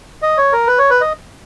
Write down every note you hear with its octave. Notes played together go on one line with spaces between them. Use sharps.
D#5
C#5
A#4
B4
C#5
B4
D#5